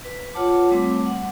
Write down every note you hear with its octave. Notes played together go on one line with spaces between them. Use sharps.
B4
F4 C#5 F#5 A5 D6
G3 A3 C4 D6
F#5